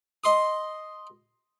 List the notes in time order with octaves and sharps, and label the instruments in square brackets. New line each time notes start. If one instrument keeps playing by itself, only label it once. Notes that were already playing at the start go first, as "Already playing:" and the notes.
[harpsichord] D#5 C6 D#6